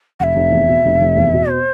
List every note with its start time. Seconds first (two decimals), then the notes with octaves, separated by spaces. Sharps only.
0.20 F1 E5 F#5
0.36 F1
0.52 E2
0.68 B2
0.85 F1
1.01 F1
1.17 E2
1.34 B2
1.49 C5